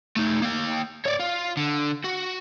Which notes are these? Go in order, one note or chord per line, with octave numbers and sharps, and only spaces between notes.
A3 D#4
A#3 G5
C#5 D5
F4
D3
F#4